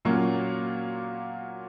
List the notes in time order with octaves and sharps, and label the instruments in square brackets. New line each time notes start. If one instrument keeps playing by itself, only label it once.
[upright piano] A#2 F#3 A#3 C#4 F4